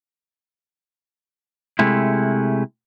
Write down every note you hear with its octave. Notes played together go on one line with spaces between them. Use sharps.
C3 G#3 A3 E4